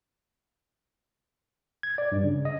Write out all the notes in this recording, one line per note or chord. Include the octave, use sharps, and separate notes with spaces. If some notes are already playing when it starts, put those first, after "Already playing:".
G#6
D5
G2
C#3
D#5